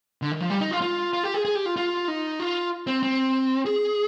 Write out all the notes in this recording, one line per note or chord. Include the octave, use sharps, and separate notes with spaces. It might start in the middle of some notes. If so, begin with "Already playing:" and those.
D3
D#3
F3
G3
D#4
F4
F4
F4
G4
G#4
G#4
G4
F4
F4
D#4
F4
C4
C4
G#4